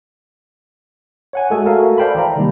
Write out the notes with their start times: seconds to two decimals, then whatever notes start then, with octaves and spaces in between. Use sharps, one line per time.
1.33 C#5 F#5 G#5
1.50 G#3 A3 F#4 G#4 A4 G#5
1.65 F#4 A4 A#4 E5 F5
1.98 C5 D5 F5 G5 A5 B5
2.15 E3 A#5
2.36 C3 D#3 G3 G#3 A#3